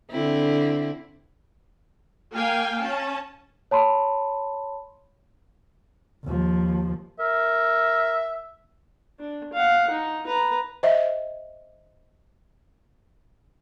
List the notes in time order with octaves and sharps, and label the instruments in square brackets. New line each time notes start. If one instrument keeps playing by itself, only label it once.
[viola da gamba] D3 C4 E4
[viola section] A#3 F5 G5 G#5
C#4 A5
[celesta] C#5 A5 B5 C6
[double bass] D#2 F3
[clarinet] A#4 [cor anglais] E5
[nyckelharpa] D4
F5 F#5
D#4
B4 A#5
[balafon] C5 D#5 E5